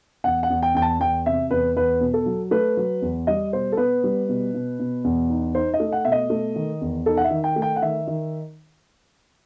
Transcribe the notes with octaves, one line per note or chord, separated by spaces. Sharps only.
E2 F#5
F#5
E2
G5
E2 G5
A5
E2 G5
C3 E5
E2 B4
E2 B4
B2
A4
F#3
A3 B4
F#3
E2
G3 D#5
B2 C5
A4
B3 B4
G3
B2
B2
B2
E2
D#4
D#4 C5
D#5
A3
F#5
B2 E5
D#5
A3
D#3
E2
D#4 A4
F#5
E5
D#3
G5
A3
G5
F#5
D#3 E5
D#3